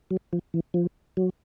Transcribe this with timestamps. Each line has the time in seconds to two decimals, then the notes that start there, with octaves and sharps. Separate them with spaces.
0.11 F#3
0.33 F3
0.54 E3
0.74 F3
1.17 F#3